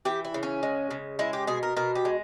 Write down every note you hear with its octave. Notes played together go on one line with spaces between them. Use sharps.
E3 G4
E4
C#3
C#4
G#3
C#3
G#3 E4
G4
B2 G#4
A#4
B2 A#4
G4
G#3